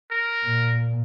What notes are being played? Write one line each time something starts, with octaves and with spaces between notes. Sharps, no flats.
A#4
A#2